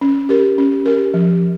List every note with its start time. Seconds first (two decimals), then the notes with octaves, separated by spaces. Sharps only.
0.01 C#4
0.29 G4 A#4
0.58 C#4
0.86 G4 A#4
1.14 F3